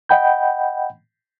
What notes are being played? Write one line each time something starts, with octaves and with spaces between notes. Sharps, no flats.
D#5 F#5 G5 B5 G6